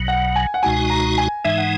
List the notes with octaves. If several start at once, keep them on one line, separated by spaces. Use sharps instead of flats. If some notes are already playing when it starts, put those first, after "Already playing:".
Already playing: B1 B2 F#3
F#5
G#5
F#5
C#2 B2 G#3 D#4 F#4 G#5
A#5
G#5
G#2 E3 G#3 D#4 E5
F#5